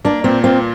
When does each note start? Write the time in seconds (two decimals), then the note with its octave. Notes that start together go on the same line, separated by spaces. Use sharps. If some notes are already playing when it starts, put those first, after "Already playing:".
0.05 A#3 D4
0.24 A#2 C4
0.44 C4 F4